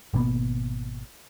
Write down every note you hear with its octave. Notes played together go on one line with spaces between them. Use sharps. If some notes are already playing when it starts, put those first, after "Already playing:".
G#1 B2 A#3 B3